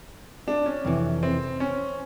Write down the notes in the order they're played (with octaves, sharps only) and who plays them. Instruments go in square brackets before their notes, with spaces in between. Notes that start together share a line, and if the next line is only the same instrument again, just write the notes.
[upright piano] D4
C#4
[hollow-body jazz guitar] F2 C3 E3
[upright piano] C4
C#4